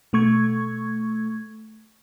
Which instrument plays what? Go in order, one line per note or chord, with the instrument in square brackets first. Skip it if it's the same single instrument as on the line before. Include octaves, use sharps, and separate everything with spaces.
[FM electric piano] B2 A3 C#6 G#6